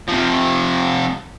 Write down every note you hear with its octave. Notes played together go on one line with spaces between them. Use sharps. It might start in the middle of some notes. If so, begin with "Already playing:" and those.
C3 F3